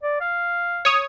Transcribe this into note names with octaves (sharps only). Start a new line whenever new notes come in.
D5
F5
C#5 D#6